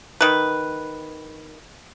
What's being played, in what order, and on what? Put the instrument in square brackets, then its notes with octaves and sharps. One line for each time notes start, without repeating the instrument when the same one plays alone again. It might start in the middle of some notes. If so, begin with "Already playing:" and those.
[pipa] D#3 B4